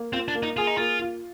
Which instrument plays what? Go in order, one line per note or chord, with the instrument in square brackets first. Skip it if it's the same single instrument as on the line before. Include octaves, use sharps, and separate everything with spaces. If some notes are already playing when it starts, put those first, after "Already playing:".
Already playing: [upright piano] A#3
[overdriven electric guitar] C4 [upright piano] F4
[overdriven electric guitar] D4
[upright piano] A#3
[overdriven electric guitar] D#4
[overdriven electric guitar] F4 [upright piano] G#4
[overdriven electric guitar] D#4
[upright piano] A#3 [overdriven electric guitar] F4
[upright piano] F4